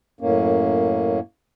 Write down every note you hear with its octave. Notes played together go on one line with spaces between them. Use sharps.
F#2 A2 A#3 C#4